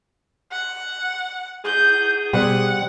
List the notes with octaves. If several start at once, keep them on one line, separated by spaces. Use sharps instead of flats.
F#5
G#4 G6
B2 G3 C4 F#5